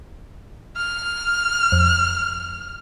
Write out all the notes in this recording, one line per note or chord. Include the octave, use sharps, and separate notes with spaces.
F6
F2